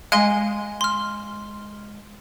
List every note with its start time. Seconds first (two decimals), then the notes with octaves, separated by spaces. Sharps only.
0.12 G#3 F5 G#5 G7
0.81 C6 F6